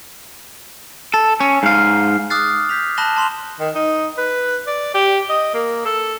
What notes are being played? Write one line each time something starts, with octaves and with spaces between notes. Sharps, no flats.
A4
C#4
G#2 F5
D6 D#6 F6 F#6 A6 C7
G6 B6 F7
A5 B5 F#6 A#6 E7 G7
A5 C6 F7 F#7
D#3
D#4
B4
D5
G4
D#5
A#3
A4